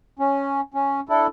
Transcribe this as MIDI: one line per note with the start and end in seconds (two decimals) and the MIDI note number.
0.19 0.61 61
0.74 1.00 61
1.09 1.27 62
1.09 1.27 64
1.09 1.27 69